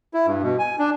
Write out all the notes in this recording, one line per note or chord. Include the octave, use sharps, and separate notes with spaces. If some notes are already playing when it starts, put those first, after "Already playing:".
E4
G2
B2
G#5
D4